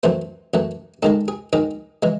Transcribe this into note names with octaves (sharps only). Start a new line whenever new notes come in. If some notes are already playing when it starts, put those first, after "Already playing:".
F#2 E3 A3 C5
F#2 E3 A3
G#2 D#3 G#3 A4
G#4
G#2 D#3 G#3 G#4
E3 G#3